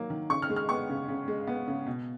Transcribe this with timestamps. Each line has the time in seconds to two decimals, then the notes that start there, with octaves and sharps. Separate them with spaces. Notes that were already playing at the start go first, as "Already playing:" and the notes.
Already playing: D#3 F#3 A#3
0.10 D#3
0.30 C#3 C#6
0.42 F6
0.50 G#3
0.56 F6
0.69 B3 C#6
0.89 C#3
1.08 C#3
1.28 G#3
1.47 B3
1.68 C#3
1.87 B2